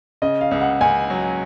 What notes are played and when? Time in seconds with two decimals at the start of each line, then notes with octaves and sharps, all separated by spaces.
0.22 C#3 D#5
0.41 F5
0.51 C#2 F5
0.61 F#5
0.81 C#2 G#5
1.10 F#3